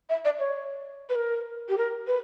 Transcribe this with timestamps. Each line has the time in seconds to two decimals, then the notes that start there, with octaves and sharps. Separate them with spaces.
0.10 E5
0.25 D5
0.39 C#5
1.09 B4
1.15 A#4
1.69 G4
1.78 A#4
2.07 B4